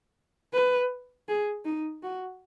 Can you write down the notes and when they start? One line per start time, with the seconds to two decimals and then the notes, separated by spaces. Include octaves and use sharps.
0.54 B4
1.28 G#4
1.65 D#4
2.03 F#4